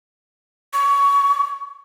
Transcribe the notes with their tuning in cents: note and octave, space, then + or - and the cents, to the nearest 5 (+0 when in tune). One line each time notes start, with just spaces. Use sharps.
C#6 +20